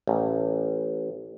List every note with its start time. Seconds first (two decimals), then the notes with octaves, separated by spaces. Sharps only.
0.07 A1